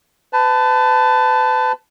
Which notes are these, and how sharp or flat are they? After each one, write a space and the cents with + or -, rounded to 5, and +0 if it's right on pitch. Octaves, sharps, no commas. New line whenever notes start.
B4 +35 A5 +0